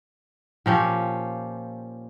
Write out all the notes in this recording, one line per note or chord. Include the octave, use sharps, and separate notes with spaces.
A#2 F3 C#4 G4